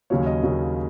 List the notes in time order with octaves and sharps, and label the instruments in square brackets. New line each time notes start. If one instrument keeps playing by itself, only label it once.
[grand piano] D#2 C#3 F#3 A#3 C#5
D#5
D#2 C#3 F#3 A#3